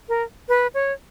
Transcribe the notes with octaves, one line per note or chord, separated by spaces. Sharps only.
A#4
B4
C#5